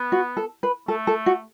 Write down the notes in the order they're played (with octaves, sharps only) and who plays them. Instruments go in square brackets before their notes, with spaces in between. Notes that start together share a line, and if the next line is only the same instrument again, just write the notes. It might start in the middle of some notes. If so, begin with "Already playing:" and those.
Already playing: [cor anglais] B3
[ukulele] F#4
A4
B4
[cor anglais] A3 [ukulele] A4
[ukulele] A4
F#4